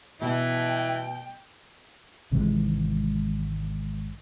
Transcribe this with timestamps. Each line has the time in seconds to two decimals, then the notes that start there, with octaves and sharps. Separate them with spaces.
0.21 B2 E3 E4 G5
2.32 G#1 C3 E3 G#3